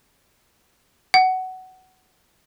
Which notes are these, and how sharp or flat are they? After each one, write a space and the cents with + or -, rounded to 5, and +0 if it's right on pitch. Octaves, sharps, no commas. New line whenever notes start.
F#5 +15